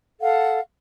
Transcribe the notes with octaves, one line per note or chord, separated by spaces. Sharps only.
A4 F5 F#5